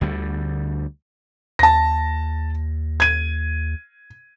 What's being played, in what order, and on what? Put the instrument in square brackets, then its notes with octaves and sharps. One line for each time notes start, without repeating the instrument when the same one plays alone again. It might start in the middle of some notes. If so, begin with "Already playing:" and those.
[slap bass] D2 D3 G3
[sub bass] D#2 [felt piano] A5 A#6
[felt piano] G#6 D#7